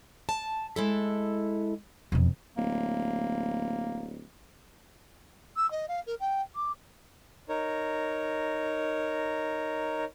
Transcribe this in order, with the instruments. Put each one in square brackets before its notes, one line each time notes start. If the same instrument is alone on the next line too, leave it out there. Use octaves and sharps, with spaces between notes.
[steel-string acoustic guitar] A5
G#3 E4 A4
[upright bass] E1 F2
[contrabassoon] D1 [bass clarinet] A#3
[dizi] E6
D#5
F5
A#4
G5
D6
[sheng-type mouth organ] D#4 A#4 C#5